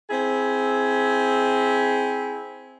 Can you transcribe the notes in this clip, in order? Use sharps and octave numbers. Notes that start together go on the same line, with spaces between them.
C4 E4 G#4